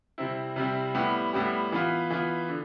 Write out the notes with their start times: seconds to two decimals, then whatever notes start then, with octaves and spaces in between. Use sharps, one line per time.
0.18 C3 G3 C4 E4
0.56 C3 G3 C4 E4
0.95 A2 G3 B3 E4 G4
1.33 A2 G3 B3 E4 G4
1.72 E3 B3 F4
2.10 E3 B3 F4
2.49 D3